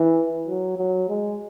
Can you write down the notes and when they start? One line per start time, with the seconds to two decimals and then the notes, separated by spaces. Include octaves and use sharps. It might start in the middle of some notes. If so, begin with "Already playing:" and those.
Already playing: E3
0.48 F#3
0.78 F#3
1.09 G#3